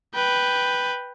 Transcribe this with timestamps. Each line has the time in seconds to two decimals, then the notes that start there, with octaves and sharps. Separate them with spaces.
0.15 B4 G5